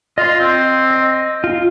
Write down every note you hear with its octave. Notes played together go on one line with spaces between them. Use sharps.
F4 D#5 C6
C4
D#5
F4